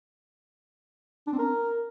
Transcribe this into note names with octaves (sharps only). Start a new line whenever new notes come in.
D4
C4
A#4